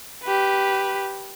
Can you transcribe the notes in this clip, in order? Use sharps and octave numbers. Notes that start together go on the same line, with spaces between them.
G4 B4